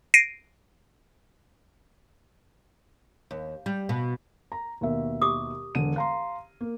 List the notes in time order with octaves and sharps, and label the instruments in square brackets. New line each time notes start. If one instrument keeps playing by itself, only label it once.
[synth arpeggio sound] A#6 C7 D7 D#7
[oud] D#2
G3
B2
[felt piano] A#5
D#2 B2 E5
[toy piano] G4 D6 D#6
[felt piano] E1 D3 D#7
F5 A#5 C6
A#3